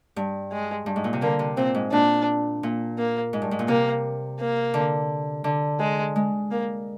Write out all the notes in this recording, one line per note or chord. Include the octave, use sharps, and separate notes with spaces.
G2
G#3
G2
G#2
A#2
C3
D3 A#3
C3
A#2 C4
G#2
A#2 D4
A#2
A#3
G#2
G2
G#2
A#2
C3 A#3
A#3
D3
D3
G#3
G#3
A#3